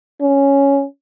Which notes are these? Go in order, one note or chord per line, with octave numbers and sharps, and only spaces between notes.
C#4